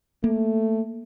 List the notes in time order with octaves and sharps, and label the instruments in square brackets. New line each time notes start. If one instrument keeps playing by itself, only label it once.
[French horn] A3 [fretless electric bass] A#3